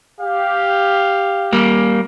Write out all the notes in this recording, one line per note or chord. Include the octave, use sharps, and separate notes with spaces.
G4 F5
G3 A#3